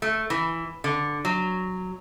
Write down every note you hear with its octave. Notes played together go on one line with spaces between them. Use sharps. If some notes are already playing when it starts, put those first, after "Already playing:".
A3
E3
D3
F#3